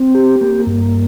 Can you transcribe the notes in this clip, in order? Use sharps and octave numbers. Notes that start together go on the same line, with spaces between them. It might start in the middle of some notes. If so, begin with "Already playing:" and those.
Already playing: C4
G4
A#3
G2